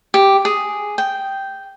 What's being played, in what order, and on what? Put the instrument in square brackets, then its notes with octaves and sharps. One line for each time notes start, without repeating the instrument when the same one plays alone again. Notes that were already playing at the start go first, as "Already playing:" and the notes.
[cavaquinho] G4
G#4
G5